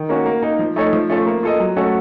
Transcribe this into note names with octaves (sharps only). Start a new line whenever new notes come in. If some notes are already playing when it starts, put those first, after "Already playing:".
Already playing: D#3
A#3 C#4 F#4
A#3
D#4 A#4
F3
A3 D#4 A4 C#5
F3
A3 C#4 F4 A4
A#3
F4 A4 D#5
F#3
A3 C#4 F#4 A4